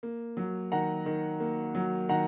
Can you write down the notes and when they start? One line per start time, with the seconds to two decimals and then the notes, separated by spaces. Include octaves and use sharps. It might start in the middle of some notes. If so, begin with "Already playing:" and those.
0.03 A#3
0.37 F#3
0.72 D#3 F#5 A#5
1.06 D#3
1.40 A#3
1.75 F#3
2.09 D#3 F#5 A#5